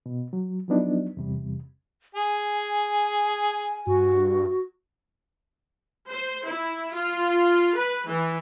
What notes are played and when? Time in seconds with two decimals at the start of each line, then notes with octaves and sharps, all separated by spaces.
0.06 B2
0.33 F#3
0.68 F3 F#3 B3 D4 D#4
1.17 E2 C3 G3
2.15 G#4 G#5
3.87 G2 F#4
6.08 C5
6.46 E4
6.93 F4
7.74 B4
8.07 E3